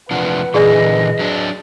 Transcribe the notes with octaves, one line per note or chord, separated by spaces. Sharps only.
C3 F3 D4 B4 F#5
A#2 D3 E3 G#4 D5 D#5 G#5
F#3 D4